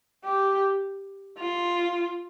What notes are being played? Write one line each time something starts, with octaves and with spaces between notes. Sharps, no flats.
G4
F4